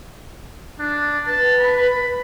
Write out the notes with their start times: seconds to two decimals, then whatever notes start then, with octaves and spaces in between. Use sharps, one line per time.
0.79 D4
1.27 B4 A5
1.60 B5